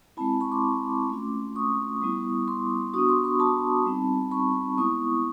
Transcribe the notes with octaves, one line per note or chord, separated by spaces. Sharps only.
G#3 C4 E4 A5 B5
B5 C#6
C6 D6
A3 C#4 F4
C#6 D#6
G3 B3 E4
C6 D6
B3 D4 F#4 C#6 D#6
C6 D6
B5 C#6
A5 B5
G3 C4 D#4
B5 C#6
G#3 B3 E4 C#6 D#6